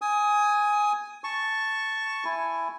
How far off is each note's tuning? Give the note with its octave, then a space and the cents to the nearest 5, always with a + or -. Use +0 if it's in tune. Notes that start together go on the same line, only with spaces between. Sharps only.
G#5 +0 D#6 +20
A5 +0 C#6 +0
E4 +10 G#5 +0